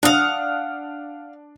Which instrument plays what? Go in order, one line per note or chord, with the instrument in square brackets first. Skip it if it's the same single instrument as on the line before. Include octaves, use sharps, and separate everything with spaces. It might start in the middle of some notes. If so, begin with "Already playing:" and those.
[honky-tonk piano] D4 D#6 [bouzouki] F5 F#5